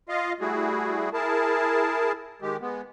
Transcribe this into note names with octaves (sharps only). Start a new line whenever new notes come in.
F4 D#5 F5
G3 A3 E4 F#4 G#4
E4 G#4 A#4 A5
D#3 G#3 G4
G#3 B3